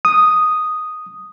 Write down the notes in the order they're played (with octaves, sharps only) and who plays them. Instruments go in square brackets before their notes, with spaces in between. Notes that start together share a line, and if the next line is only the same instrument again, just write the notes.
[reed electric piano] D#6